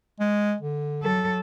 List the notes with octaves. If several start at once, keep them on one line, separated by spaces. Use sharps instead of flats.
G#3
D3
F#3 A4